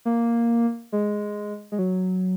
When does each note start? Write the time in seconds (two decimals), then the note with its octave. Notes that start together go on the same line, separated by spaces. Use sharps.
0.05 A#3
0.92 G#3
1.72 G#3
1.79 F#3